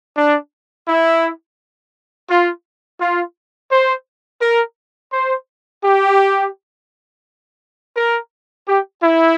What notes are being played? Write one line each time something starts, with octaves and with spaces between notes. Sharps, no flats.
D4
E4
F4
F4
C5
A#4
C5
G4
A#4
G4
E4